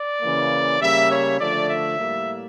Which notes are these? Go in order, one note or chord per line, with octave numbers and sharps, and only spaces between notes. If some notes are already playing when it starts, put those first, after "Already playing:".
Already playing: D5
C#3 E3 A#3
C#3 G3 A#3 E5
C#5
D3 F3 A3 D5
E5
A2 G3 A#3